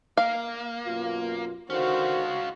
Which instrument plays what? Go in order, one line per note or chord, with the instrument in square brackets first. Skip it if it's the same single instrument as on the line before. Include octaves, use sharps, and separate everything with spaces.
[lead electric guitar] A#3 [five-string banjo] F5
[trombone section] F#2 B2 F4
[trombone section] D3 D#3 C5 [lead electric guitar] C#4 F4 [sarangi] F#4